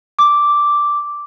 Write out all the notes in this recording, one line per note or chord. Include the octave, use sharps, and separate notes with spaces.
D6